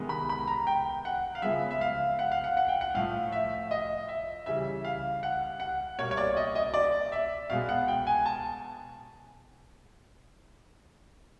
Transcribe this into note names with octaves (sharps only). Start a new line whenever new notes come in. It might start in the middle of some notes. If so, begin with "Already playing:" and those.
Already playing: C3 D#3 G#3 B3
B5
B5
A#5
G5
F#5
F5
C#3 F3 G#3 B3 E5
E5
F5
F#5
F5
F#5
F#5
G5
F#5
A2 F3 A3 F5
E5
D#5
E5
C#3 E3 G3 E5
F5
F#5
F#5
B2 G3 A#3 C#5
C#5
D5
D#5
D#5
D5
E5
B2 G#3 B3 F5
F#5
G5
G#5
A5